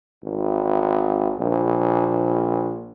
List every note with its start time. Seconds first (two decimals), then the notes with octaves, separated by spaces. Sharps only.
0.24 G#1
1.38 A#1